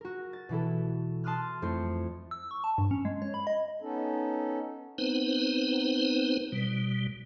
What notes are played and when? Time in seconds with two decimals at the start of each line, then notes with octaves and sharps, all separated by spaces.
0.01 F#4 A#4
0.33 A6
0.49 B2 E3 E4 A4
1.24 A5 C6 D#6 F6 F#6
1.62 F2 A3 C4 E4 C6 C#7
2.31 E6
2.51 C#6
2.64 A5
2.78 G2
2.91 C#4
3.05 G#3
3.22 C#5
3.34 B5
3.47 D#5
3.82 B3 C#4 D#4 A4
4.98 B3 C4 D#4 B4 C5
6.52 B2 G3